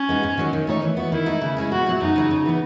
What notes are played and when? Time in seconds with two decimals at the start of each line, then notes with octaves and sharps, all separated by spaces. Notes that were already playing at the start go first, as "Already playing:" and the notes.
Already playing: C#4
0.09 G#3 B3 D#4 F#4
0.23 G#2
0.37 D#3 F#3 C#4
0.53 D#3
0.67 A3 D#4 A4 C#5
0.82 E3
0.97 B3 F#4
1.11 D#3 E4
1.26 A3 D#4
1.41 C#3
1.57 G#3 C#4 E4 G#4
1.71 B2 F#4
1.86 F#3 A3
2.01 F#2 D#4
2.16 C#3 F#3
2.31 C#3
2.46 E3 B3